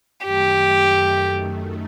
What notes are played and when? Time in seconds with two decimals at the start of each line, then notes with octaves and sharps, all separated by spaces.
0.24 F#2 D#3 A3 G4